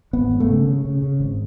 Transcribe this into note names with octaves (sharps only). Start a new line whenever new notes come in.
G#1 B3
G#1
A3
C#3
C#3
C#3
C#3
G#1